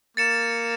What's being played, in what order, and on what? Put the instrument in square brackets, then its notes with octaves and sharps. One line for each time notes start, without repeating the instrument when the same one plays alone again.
[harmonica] A#3 [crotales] A6 C#7 E7